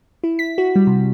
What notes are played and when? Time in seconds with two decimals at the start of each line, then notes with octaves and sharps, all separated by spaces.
0.24 E4
0.39 B6
0.58 F#4
0.76 G3
0.87 C3